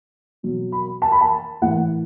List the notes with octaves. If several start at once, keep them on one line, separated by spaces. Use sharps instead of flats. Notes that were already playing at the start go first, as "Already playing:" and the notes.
B2 F#3
B5
A5
B5
A5
A2 E3 F#5